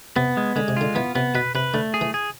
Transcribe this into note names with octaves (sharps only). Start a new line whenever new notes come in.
C3 B3
G#3
D3 G#3
C3
D3 F4
E3 B3
C3 B3
B2 B4
C3 B4
D3 A3
G#4
E3
G#4